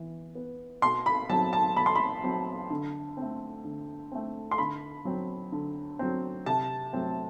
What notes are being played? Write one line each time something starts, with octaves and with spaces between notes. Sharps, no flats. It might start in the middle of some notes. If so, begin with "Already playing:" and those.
Already playing: E3 B3
B3
B2 C6
B5
F#3 C4 A5
A5
B2 B5
C6
B5
F#3 C4
D3
A3 C4
D3
A3 C4
C6
D3 B5
F#3 C4
D3
F#3 C4
C3 A5
F#3 A3 C4